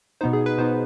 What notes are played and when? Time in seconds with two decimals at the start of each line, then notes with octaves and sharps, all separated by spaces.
0.21 B2 B3 D#4 C5
0.33 G#4
0.46 B4
0.58 B2 B3 D#4 C5